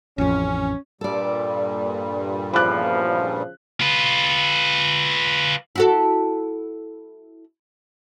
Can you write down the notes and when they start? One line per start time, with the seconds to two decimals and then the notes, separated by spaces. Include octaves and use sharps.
0.18 A1 F2 C#4
1.01 G2 A#2 G3 A4 D5
2.53 E2 C#3 F3 B5 D6 F#6
3.81 F4 B4
5.76 E4 F#4 A4